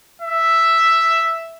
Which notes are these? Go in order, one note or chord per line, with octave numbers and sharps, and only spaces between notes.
E5